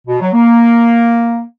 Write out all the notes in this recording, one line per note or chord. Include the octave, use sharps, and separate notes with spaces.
B2
F#3
A#3